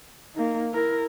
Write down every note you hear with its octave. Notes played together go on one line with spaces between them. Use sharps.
A#3 D#4
E4 A#4